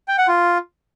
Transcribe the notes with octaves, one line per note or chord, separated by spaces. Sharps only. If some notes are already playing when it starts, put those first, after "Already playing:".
G5
F#5
F4